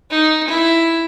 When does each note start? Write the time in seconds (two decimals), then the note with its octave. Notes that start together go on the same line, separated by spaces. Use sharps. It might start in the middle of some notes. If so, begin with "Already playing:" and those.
0.10 D#4
0.48 E4